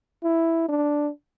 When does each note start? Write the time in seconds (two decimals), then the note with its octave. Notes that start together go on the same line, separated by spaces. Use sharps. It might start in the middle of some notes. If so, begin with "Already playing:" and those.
0.24 E4
0.69 D4